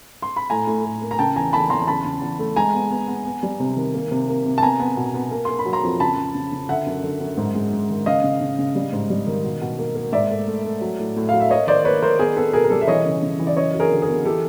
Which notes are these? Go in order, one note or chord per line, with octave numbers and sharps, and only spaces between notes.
C6
B5
A2 G#5 A#5
A2
A2
A#3
A#5
C#3 G5 A5
E2 G#5 A#5
E2 A5 B5
E2 A#5 C6
C#3 A5 B5
C#3
E2
A3
G#3 G#5 A#5
B3
B3
B3
B3
G3
C3
D#3
A#3
C3
A#3
C3
A5
B3 G#5 A#5
B3
B2
B3
A#3
A#3 C6
B5
F#3
A#5 C6
F2
C#3 A5 B5
C#3
C#3
C#3
D3 E5 F#5
F#2
D3
F#2
G#2
G#3
G#3
D#3
C#3 D#5 F5
C#3
C#3
C#3
G3
G#2
G3
D#3
B2
B2
A#3
A#3
G#2 D5 E5
A3
A3
A3
F#3
A2
A2
F#3 F5
E5
A#3 C#5 D#5
D#3 C5 D5
A#3 B4 C#5
D#3 A#4 C5
B3 G#4 A#4
B3 A4 B4
B2 G#4 A#4
A#4
G3 G4 A4
E5
E3 C#5 D#5
C#3
C#3
E3
D5
F#2 C#5 D#5
F#3
G#4 A#4
D3
G#4 A#4
B3
E3 G4 A4